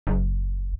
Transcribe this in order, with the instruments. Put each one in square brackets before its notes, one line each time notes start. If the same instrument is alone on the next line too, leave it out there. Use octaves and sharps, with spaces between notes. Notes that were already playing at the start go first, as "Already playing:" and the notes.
[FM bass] F#1